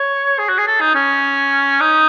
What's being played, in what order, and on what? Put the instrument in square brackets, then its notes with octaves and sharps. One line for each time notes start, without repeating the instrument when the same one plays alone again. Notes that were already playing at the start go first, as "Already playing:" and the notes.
Already playing: [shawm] C#5
G#4
F#4
G#4
A4
D#4
C#4
D#4